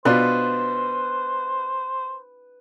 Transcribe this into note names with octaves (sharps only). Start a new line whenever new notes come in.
B2 D4 F4 B4 C5